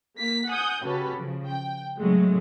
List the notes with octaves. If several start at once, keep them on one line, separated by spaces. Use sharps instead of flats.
A#3 B6
F#5 G#5 D#6 G6
C#3 C#4 F#4 G4 A4 B4
C#3 F3
G5
A2 C#3 F#3 G#3 A3